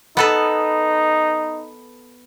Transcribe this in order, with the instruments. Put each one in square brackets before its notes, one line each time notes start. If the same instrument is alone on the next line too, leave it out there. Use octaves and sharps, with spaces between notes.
[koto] B3 A4 B4 [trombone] D#4